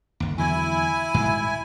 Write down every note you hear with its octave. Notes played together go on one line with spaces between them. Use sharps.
G1 D#2
E2 D3 F#3 E4 G#5
D#1 G#2 B2